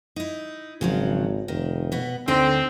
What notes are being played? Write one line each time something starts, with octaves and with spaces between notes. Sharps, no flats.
D#4 E4
G#1 C#3 F3 F#3
F1 D#3
B2 B3
D2 D3 C4 D#4 G5